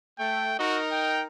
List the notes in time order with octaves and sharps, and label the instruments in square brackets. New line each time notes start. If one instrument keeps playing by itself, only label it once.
[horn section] A3 [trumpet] G5
[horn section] D#4 A#4 [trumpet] F#4
[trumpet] G5